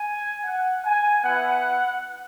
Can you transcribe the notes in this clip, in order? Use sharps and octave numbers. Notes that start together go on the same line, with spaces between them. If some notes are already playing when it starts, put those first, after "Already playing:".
Already playing: G#5
F#5
G#5
B3 E4 F#5